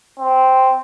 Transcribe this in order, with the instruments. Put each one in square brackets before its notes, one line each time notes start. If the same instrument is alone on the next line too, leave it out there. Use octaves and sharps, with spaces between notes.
[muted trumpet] C4